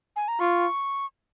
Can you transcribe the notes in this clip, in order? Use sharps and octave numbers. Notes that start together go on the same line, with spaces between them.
G#5
A#5
F4 C#6